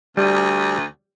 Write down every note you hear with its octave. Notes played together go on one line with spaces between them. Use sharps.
D2 G3